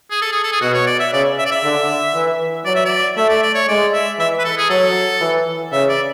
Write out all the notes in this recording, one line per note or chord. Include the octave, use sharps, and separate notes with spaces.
G#4
A4
G#4
A4
G#4
B2 F#4
C#5
D5
E5
C#3 D5
E5
D5
E5
D3
E3
F#3 D5
E5
D5
A3 E5
D5
D5
C#5
G#3 D5
E5
E3 E5
B4
A4
G#4
F#3 A4
E3
C#3 E5
D5